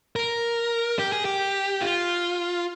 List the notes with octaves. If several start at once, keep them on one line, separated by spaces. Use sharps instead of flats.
A#4
G4
G#4
G4
F4